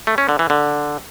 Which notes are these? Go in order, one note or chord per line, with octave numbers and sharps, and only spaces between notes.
A3
C#4
D3
E3
D3